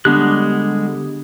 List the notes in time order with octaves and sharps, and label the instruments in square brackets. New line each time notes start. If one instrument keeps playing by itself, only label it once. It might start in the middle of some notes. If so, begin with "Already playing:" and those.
[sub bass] D3 [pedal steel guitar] G3 G#3 F#6 [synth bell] B3 D4 G4